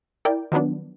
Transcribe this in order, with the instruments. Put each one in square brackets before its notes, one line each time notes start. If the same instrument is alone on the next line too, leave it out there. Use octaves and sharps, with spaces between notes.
[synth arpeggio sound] E4 A#4 D5 G5
D#3 F3 F#3 B3 D4